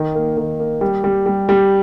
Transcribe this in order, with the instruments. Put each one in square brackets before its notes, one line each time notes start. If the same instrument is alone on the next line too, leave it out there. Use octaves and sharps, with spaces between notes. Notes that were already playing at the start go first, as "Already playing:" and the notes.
Already playing: [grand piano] D#3
A#3
D#3
A#3
G3
G3
G3
G3